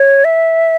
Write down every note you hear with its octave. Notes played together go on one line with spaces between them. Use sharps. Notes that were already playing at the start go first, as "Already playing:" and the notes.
Already playing: C#5
E5